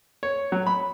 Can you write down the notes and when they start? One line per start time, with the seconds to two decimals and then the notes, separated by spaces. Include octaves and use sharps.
0.23 C#5
0.52 F#3
0.67 B5